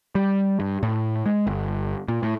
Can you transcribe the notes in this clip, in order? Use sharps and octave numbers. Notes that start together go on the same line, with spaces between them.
G3
G2
A2
G#3
G1
A#2
A2